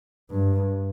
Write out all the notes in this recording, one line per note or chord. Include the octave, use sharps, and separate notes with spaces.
G2